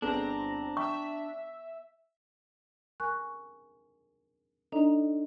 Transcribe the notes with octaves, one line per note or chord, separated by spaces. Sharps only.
G1 B3 C4 D4 G#4 A4 A#5
E5 G5 C#6
A#4 G#5 C#6 F#6
D4 D#4 A4 D5 D#5 A#5